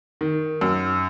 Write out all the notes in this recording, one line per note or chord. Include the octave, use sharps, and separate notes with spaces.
D#3
F#2